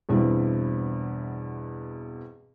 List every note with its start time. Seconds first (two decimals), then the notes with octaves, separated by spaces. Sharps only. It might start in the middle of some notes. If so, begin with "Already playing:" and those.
0.09 E2 G2 B2 G3 C4 E4